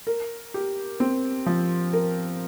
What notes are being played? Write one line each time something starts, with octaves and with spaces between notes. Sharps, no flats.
A#4
G4
C4
F3
A#4